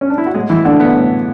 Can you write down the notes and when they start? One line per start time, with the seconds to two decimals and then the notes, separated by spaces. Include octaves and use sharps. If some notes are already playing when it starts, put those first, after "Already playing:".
0.01 C#4
0.10 D4
0.18 E4
0.26 F#4
0.34 A2 G#3 G#4
0.50 E3 E4
0.65 D3 A3 D4
0.80 B3
0.95 A2